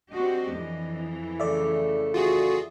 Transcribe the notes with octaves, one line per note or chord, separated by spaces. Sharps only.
C4 D4 F#4 G4 D#5
F2 E3
C#3 A3 A4 D5 E5
F4 F#4 G#4